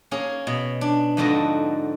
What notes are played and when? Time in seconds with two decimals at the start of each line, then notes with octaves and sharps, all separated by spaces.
0.11 A#3 C#4 G#4
0.47 B2
0.81 D4
1.17 F2 G#2 D3 F#4 D#5 A5